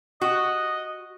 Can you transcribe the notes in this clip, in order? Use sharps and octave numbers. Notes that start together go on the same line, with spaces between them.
F#4 D#5